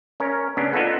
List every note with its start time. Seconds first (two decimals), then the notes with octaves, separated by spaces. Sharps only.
0.20 C#4 A#4 C#5
0.57 C#3 B3 C#4 D4
0.73 B3 D4 D#4 F4 A4 B4